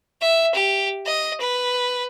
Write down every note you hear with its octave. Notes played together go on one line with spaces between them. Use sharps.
E5
G4
D#5
B4